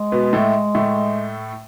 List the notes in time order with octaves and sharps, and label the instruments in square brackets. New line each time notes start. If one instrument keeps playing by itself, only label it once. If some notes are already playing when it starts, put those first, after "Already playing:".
Already playing: [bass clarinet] G#3
[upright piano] B2 B3
A2 A3
A2 A3